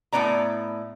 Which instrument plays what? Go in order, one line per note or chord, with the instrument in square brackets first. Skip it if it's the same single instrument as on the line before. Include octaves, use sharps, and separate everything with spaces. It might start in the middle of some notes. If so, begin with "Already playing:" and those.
[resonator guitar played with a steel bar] A2 A#3 B3 D5 A#5